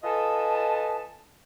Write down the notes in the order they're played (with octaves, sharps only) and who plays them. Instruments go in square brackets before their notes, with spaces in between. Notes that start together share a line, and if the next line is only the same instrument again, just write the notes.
[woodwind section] F4 A4 B4 D#5 G#5 A5